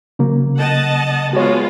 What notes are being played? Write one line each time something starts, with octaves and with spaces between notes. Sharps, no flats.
C#3 F#3 A#3
D#5 F#5 A5
G#3 B3 F4 F#4 C#5